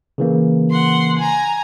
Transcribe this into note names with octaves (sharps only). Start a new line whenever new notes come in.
C#3 E3 A#3
F#5 C6
G#5 A#5